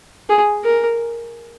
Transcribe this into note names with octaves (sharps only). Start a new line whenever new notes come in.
G#4
A#4